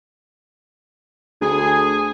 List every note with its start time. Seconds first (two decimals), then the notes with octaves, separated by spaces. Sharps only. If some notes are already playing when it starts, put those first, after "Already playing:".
1.41 D2 G#4